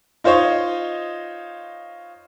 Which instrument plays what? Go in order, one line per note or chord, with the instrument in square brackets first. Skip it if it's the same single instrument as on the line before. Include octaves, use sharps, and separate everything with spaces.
[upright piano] D#4 F4 C5 C#5 D#5